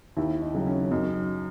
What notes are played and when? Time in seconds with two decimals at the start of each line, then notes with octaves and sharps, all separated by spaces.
0.17 D#2 E4
0.42 D#4
0.54 C#3 F#3
0.67 C#4
0.91 F#2 D#4